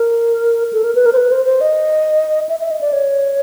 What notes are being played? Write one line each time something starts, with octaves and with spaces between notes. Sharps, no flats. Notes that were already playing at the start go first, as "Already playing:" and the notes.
Already playing: A#4
A4
A#4
B4
A#4
C5
B4
C5
C5
D#5
E5
E5
D#5
D5
C#5